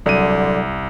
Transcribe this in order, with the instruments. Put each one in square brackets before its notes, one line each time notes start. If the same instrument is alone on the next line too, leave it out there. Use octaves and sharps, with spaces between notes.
[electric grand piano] C2 D#7 [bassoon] D3 [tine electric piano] F#3